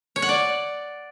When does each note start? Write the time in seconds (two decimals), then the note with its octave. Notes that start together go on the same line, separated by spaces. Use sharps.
0.16 C#5
0.22 F#5
0.29 D5